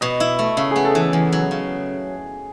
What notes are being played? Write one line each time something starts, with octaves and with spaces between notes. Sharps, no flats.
B2 D#5
E4
A3
C#3 E5
B3 G#4
A4
E3 A4
E2 G#4
F#3
C#3